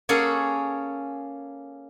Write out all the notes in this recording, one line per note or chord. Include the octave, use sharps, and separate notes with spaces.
A#3 C#4 G#4 A4 F#5